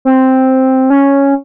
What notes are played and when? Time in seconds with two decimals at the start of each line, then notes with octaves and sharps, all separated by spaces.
0.05 C4
0.90 C#4